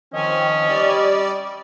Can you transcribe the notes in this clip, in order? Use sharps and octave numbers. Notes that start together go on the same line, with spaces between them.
D#3 F3 C4 C#4 D#5
G3 D5